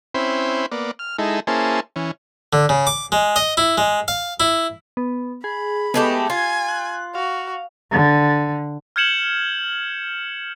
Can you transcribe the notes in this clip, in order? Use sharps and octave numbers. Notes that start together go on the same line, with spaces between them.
C4 C#4 E4 C5 B5
A#3 B3 D5
F6
G#3 D#4 E4 A4
A#3 C#4 E4 G#4 C5 A5
E3 C#4
D3
C#3
D6
G#3
D#5
E4
G#3
F5
E4
B3
G#4 B5
G#3 A3 B3 G4
F4 G#5 G#6
F#6
F#4 F5
D3
F6 G6 G#6 C#7 E7 F#7